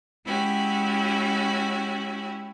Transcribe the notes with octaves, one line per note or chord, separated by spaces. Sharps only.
G#3 C#4 E4 F#4 G4